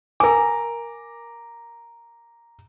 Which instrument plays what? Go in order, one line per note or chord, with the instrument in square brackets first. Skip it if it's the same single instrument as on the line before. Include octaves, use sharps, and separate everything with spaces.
[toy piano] A#4 G#5 [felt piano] A#5 D6